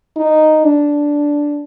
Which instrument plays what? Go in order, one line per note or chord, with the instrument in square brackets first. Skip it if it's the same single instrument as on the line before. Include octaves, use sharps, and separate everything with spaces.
[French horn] D#4
D4